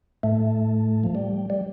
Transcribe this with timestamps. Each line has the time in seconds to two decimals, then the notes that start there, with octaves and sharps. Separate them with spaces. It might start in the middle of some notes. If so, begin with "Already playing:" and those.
0.23 A2 A3
1.04 F3
1.15 G3
1.50 G3